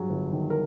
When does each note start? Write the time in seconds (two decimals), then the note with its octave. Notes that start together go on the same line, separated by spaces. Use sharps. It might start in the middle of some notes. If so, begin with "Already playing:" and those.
Already playing: G2 F#3 G#4
0.10 G1
0.32 D#3
0.50 A#4